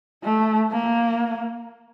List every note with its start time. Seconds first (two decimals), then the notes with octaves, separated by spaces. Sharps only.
0.23 A3
0.71 A#3